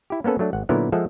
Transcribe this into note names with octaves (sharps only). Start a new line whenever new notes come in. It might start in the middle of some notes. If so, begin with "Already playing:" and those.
E4 G4
A#3 B3 C#4 A4 B4
F#3 A3 D4
G#1 F#5
A#2 D3 F#3 B3 E4 A#4
F3 G#3 F4 A4 E5 F#5